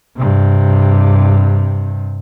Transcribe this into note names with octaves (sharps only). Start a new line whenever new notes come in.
G2 C3